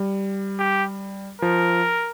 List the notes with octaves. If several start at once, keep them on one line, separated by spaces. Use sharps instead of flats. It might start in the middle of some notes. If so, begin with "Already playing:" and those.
Already playing: G3
G4
F3 A#4